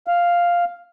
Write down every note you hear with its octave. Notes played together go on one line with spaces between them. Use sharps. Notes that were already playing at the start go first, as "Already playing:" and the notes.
F5